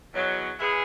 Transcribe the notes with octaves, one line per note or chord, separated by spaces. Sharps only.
E2 B2 F#3
G#3 B3 E4 G#4